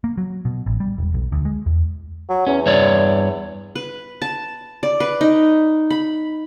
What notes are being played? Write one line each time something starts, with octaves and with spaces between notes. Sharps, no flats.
A#3
F#3
B2
A1
G3
E1
B1
D2
G#3
E2
F#3
E2 C#4
G2 C#5 D5
B4
A5
D5
B4
D#4
B5